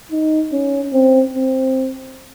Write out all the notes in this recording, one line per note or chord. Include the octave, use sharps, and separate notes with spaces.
D#4
C#4
C4
C4